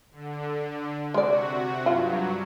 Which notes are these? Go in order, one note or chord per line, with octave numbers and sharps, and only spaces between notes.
D3
C3 G#3 F#4 D5
G2 F#3 F4